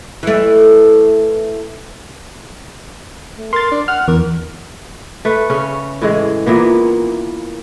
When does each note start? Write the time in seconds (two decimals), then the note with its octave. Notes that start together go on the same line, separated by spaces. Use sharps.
0.23 E3 A3
3.37 A3
3.53 A#4 C6 A6
3.72 D4
3.88 F#5 F6
4.08 E2 A#4
5.25 A3 B4
5.50 C#3 C#4
6.02 A2 E3 G#3
6.46 A#2 E3 A#3 B3